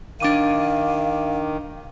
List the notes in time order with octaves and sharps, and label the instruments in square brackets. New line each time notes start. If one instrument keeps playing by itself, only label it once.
[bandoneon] D#3 [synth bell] D4 D6 D#7 [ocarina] F5